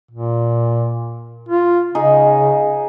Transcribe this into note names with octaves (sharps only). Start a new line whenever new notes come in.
A#2
F4
C#3 D#4 G#4